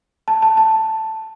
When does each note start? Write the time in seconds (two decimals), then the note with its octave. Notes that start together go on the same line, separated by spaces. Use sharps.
0.28 A5
0.42 A5
0.57 A5